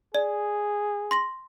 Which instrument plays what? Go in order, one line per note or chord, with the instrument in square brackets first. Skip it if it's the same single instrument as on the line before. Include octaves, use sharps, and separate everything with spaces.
[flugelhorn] G#4 [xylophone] D5
[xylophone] C6 A#6 F#7